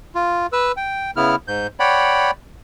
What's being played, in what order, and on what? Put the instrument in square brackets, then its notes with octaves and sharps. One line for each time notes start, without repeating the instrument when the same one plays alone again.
[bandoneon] F4
B4 E6
G5
C#3 B3 E4 F6
G#2 G6
C#5 D5 F#5 G5 B5